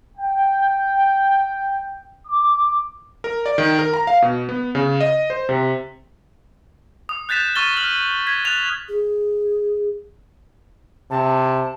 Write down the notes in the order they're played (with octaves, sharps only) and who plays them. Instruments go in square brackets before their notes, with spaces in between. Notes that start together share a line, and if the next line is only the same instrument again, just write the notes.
[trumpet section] G5
D6
[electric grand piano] A#4
D5
D#3
A#4
A#5
F5
B2
B3
C#3
D#5
C5
C3
[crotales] D#6
F#6 G6 A6 B6 E7
C#6 D#6 F6 A6 G7
F6 F#7
G#6 B6
F#6 A6 F7
[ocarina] G#4
[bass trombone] C3 [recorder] A5